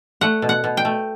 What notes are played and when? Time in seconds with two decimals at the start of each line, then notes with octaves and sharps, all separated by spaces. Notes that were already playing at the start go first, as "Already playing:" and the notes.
0.21 A3 F#5
0.42 B2
0.49 F#5
0.64 B2
0.77 G5
0.85 A3